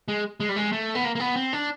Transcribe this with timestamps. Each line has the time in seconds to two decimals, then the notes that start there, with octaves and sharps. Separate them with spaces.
0.08 G#3
0.40 G#3
0.49 G3
0.56 G#3
0.72 A3
0.95 B3
1.05 A#3
1.15 A#3
1.20 B3
1.36 C4
1.53 D4